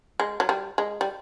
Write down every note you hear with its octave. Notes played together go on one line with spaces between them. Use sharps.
G#3
F#3
G3
G#3
G3